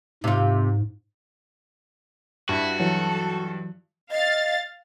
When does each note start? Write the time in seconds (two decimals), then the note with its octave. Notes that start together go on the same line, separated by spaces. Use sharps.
0.24 G#2 C3 F4
2.49 G2 E4 F#4
2.80 E3 F#3 A4
4.11 D#5 F5 A6